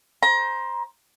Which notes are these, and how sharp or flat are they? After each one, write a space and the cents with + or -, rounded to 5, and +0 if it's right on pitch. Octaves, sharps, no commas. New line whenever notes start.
C5 +0 A#5 +30